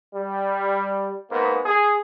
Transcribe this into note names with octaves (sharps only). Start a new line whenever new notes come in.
G3
G#2 A#3 B3
G#4